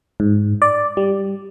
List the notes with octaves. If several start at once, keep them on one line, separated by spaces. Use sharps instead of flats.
G#2
D5
G3